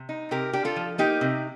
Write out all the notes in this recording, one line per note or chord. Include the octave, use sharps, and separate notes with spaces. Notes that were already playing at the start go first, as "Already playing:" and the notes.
Already playing: C3
D#4
C3 G4 A#4
D4 G4
F4 A4
F3
A#3 D#4 G4
C3